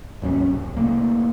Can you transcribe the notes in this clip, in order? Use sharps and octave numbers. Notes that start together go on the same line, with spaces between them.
G#1 D#2 F#3 C#4
C2
C3 A3 A#3